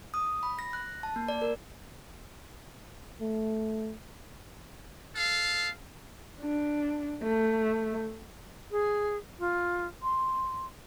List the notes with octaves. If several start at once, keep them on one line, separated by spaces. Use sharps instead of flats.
D#6
B5
A#6
F#6
A5
A#3
D5
A#4
A3
A4 F5
D4
A3
G#4
F4
C6